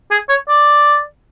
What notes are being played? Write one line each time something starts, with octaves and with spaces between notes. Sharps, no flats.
G#4
C#5
D5